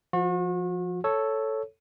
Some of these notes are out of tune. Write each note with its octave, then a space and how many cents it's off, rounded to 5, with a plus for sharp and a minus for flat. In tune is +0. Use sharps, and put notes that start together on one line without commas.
F3 +0 F#4 -40
A4 +0 C#5 +0